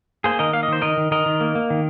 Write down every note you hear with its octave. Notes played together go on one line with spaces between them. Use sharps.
A#3 G#4 C5
D#3 A#4 D#5
A#3 F5
D#5
D#3 C5
D#3 A#4 D#5
D#3
D#3 A#4 D#5
D#3
A#3
A#3
D#3